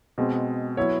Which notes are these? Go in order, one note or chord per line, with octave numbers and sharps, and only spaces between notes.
B2 G#3 C4
F#3 B3 E4 C#5